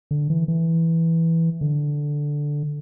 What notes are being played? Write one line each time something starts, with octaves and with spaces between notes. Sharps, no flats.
D3
E3
E3
D3